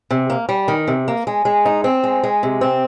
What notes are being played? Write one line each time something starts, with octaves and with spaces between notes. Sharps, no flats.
C3
A#3
G3
D#3
C3
A#3
G#3
G#3
D#4
C4
G#3
G#3
C3
C4